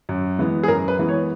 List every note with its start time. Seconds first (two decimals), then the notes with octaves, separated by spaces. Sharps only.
0.09 F#2
0.39 E3 G#3 B3
0.63 G#4
0.68 F#2 A#4
0.88 B4
0.99 E3 G#3 B3
1.09 C#5